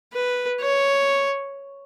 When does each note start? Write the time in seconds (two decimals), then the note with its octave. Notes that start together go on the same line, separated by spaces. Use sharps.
0.14 B4
0.61 C#5